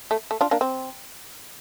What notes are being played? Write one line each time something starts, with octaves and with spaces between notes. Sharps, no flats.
A3
A3
D4 F4
A#3 D4
C4